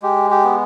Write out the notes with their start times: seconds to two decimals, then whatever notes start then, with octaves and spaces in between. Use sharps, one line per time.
0.03 G#3 G4
0.31 G4
0.44 B3